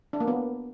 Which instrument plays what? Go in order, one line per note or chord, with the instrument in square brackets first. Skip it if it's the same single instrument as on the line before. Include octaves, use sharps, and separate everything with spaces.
[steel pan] D4
A#3
B3